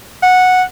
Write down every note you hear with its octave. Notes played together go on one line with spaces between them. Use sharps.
F#5